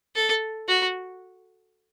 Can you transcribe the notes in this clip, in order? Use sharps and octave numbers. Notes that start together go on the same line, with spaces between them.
A4
F#4